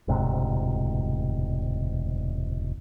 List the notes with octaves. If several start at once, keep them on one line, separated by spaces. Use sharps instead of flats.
E1 D2 G#2 C3